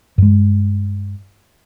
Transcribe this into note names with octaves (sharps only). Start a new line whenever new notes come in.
G2 G#3